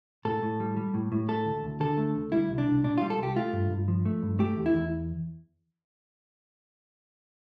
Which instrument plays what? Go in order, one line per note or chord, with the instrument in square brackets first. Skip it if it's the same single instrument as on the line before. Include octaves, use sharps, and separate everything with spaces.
[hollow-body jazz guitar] A2 A4
A2
G3
G3
A2
A2
A3 A4
D2
D2
D3 A4
A3
D2
G3 E4
C2
D4
C2
A#2 D4
G3 F4
A4
C2 G4
A3 F4
G2
G2
F3
A3
G2
A3 G4
E2
E4
E2